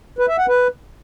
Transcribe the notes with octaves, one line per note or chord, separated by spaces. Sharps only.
B4
E5
F#5
B4